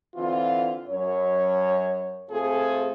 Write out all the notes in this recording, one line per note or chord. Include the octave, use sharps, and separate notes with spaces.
D3 E3 C4 F4
F#2 C#5
C3 A3 C4 F4 G#4 A4